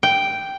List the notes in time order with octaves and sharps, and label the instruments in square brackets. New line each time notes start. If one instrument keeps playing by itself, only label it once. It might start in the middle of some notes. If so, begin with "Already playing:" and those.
[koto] G5